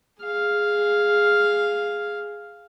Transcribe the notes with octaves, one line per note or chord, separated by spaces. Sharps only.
G#4 F5